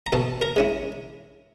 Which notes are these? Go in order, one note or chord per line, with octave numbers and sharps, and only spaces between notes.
A#5
B2 A4 A5
A#4 A#5
G#3 C#4 E4